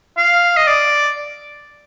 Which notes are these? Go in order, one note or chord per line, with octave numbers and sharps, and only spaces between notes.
F5
D#5
D5